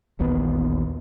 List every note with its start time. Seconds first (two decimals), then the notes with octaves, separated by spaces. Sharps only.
0.19 E1 A#1 D#2 B3